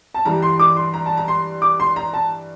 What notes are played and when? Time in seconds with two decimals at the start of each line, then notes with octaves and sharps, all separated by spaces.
0.14 A5
0.25 G2 E3 G3 A#5
0.42 C6
0.60 D6
0.76 C6
0.94 A#5
1.06 A5
1.17 A#5
1.28 C6
1.62 D6
1.80 C6
1.96 A#5
2.14 A5